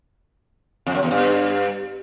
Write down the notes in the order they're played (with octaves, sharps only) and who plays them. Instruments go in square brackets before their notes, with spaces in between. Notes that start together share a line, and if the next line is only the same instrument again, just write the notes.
[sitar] F2
F#2
E2
G2